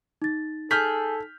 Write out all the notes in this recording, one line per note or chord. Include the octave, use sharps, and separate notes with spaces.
D#4 A6
G#4 A4 F6 G6 B6